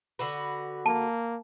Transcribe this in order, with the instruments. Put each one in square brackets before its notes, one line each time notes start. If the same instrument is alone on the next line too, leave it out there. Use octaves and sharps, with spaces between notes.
[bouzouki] D3 F#4 B4
[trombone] A#3 [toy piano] A5